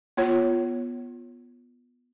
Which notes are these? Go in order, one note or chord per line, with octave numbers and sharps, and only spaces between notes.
B3 F4 C#5